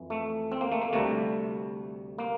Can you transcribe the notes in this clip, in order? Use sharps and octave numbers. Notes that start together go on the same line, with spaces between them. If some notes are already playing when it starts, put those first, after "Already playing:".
Already playing: F2 E3
A3
C4
A#3
A3
A#3
D2 C3 G3 A3
A#3